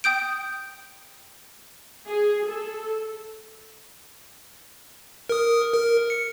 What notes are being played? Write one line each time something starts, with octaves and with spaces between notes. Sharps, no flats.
G5 D#6 G6 D7
G#4
A4
A#4 D#6
A#4
C#7